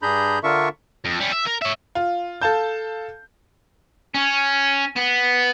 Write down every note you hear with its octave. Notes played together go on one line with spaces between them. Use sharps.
G2 D4 G#4 A#5 B5 G6
D3 D4 F4 A#4 E5 C#6
F2
G3 C#4
E5
A#4
C#5 E5
F4
A4 F5 A5 G6
C#4
B3